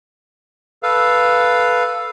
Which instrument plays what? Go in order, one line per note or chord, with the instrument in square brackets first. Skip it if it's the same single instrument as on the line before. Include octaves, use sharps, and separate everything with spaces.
[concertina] A4 B4 F5